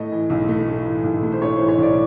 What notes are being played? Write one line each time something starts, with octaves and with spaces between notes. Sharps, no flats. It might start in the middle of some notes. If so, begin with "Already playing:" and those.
Already playing: A2 A3 D#5
E3
B1
A3
A2
E3
B1
A3
C5
A2 C#5
E3 C5
C#5
B1 D5